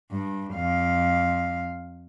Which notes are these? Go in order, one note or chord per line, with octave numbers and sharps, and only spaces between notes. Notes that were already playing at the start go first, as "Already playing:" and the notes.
G2
F2 F5